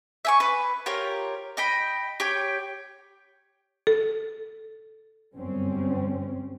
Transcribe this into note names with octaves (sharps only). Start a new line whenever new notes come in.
E5 G#5 C#6
B4
F4 G4 A#4 C#5
D#5 G5 B5
G4 C#5 G5
A4
G1 F#2 G3 C4 C#4